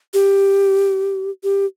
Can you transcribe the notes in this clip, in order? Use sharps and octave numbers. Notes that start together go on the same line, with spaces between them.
G4
G4